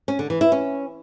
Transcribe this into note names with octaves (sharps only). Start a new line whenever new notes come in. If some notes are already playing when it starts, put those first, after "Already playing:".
C#4
D3
E3
E4
C#4